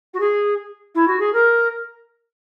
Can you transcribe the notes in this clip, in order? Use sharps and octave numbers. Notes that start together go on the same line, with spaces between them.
F#4
G#4
E4
F#4
G#4
A#4